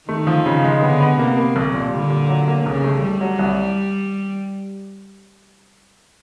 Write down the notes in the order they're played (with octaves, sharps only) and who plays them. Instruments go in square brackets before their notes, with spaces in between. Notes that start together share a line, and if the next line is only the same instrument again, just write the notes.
[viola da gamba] D#3 [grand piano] A3
[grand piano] F3
C#3
G#3
[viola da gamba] D3 [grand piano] B3
[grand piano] B3
[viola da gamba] C3 [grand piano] A#3
[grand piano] A#3
B1
A#2
[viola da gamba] D3 [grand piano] G3
[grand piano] A#2
F#3
A#3
[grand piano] B1 [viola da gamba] C#3
[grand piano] A3
[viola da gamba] G3 [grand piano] A3
[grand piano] F#3
C2